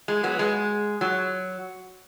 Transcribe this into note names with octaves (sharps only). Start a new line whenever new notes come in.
G#3
F#3 B3
G#3
F#3